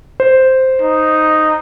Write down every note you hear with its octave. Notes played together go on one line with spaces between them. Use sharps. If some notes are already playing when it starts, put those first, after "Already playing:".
C5
D#4